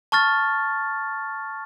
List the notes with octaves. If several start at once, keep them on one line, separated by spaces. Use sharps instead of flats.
A5 C#6 F6 A6